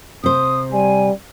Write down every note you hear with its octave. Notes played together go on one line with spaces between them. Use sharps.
C3 C5 D#6
G3 G#5